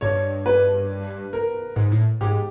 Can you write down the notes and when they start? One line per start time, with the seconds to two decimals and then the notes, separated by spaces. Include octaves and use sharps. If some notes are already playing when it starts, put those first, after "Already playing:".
0.01 G2 C#5
0.46 B4
1.33 A#4
1.76 G#2
1.92 A2
2.21 G#2 G4